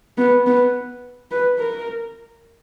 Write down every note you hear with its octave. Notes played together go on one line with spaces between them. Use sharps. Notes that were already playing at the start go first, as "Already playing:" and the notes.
B3
B3
B4
A#4